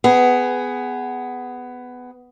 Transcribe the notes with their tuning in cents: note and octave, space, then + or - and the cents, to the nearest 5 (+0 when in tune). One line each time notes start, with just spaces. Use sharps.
B3 +15 G#4 +0